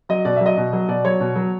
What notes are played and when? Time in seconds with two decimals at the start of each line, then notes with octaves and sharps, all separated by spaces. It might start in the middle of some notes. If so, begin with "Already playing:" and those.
0.09 F#3 D#5
0.25 B2 D5
0.36 F#3 E5
0.46 D#5
0.57 B2
0.73 F#3
0.88 B2 D5
1.05 F#3 C#5
1.20 B2
1.36 F#3